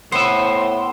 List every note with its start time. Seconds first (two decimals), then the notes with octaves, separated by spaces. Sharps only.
0.12 A2 B3 C5 E5 C6